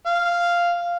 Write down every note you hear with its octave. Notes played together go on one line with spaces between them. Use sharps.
F5